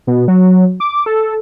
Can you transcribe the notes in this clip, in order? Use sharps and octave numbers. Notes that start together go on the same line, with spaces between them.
B2
F#3
D6
A4